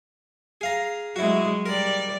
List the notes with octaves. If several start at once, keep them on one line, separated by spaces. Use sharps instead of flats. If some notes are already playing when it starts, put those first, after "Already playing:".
G#4 F5 A#5
F#3 G#3 E4 F#4
G3 A#4 D5